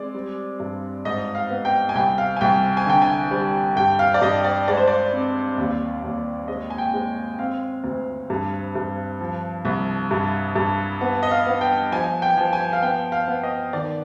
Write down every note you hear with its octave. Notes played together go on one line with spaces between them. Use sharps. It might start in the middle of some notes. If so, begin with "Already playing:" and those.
Already playing: G#3 C4 D5
G3
G2
G#2 D#5
F5
B3
G5
G#5
C2 G5
F5
G#5
C2 G5
G#5
D3 G5
G#5
G3
G2 G5
F5
D5
G2 D#5
D5
G#3 D5
C5
D5
C4
D#2
D#2
G#3 D#5
G#5
G5
G#3
C4 F5
D2
G2
G2
F3
C2
G2
G2
B3
D#5
F5
B3
G5
F3 G#5
G5
F3
G#5
F5
B3 G5
F5
B3
D#5
D#3 D5